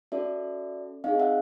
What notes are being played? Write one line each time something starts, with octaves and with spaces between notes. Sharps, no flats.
C#4 F#4 A4 D5 E5
C4 D#4 G#4 D#5 F5
E5 F#5